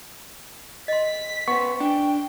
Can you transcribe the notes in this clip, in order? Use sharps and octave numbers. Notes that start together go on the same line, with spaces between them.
D#5 C6 B6
B3 C5 C#6
D4 G5 G#5